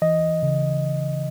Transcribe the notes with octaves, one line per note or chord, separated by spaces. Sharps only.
E3 D#5
C#3